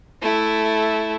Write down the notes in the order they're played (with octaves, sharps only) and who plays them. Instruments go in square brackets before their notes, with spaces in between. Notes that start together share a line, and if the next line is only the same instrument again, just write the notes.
[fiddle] A3 E4